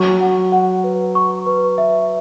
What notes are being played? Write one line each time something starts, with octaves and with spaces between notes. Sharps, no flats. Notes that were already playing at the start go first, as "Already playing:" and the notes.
Already playing: F#3 C#6
F#5
F#5
B4
C#6
B4
E5